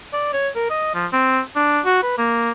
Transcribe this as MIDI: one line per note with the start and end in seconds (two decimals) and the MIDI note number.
0.13 0.32 74
0.33 0.49 73
0.55 0.69 70
0.70 0.93 75
0.95 1.06 53
1.13 1.40 60
1.56 1.80 62
1.85 2.01 66
2.03 2.15 71
2.18 2.52 58